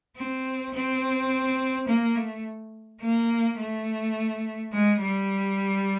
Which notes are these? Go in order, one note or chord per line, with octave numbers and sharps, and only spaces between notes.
C4
C4
A#3
A3
A#3
A3
G#3
G3